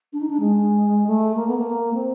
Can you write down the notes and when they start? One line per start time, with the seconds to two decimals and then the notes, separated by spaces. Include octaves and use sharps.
0.13 D4
0.20 D#4
0.30 D4
0.40 G#3
1.07 A3
1.36 A#3
1.47 B3
1.57 A#3
1.94 C4